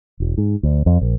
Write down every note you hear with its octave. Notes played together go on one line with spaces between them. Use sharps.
E1
G#2
D2
F2
A#1